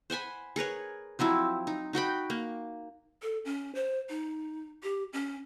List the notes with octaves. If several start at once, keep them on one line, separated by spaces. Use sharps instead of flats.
C5 F#5 G#5 B5
G#4 A#4 B4 C#5
F3 F#3 C4 E4
D#4
D#4 F#4 G5 B5
A#3
A4
C#4
C5
D#4
G4
C#4